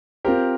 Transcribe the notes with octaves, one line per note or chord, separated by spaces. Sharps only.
C4 F4 G4 A#4 C5